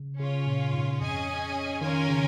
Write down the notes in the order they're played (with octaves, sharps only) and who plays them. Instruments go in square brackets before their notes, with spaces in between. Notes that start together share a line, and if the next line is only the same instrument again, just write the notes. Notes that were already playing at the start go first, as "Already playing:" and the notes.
Already playing: [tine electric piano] C#3
[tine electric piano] C#3 [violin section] C#4 F4 C#5
[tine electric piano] A#2
G#2
[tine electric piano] F2 [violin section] C#4 G#4 D#5 G#5
[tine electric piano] D#3 [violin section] C#4 F4 A#4 C#5 G#5
[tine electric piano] C#3